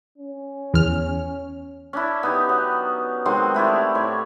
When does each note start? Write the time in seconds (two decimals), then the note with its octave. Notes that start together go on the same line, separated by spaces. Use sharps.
0.18 C#4
0.74 E2 F6
1.93 C#4 D4 E4
2.23 B3 D#4 G4
2.49 F#3
3.25 D#3 F#3 G#3 C4
3.55 A3 E4 G4 D5
3.95 A2 C#5